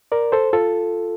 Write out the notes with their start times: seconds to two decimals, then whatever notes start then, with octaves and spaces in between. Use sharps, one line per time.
0.12 A#4 D5
0.32 A4 C5
0.53 F4 A4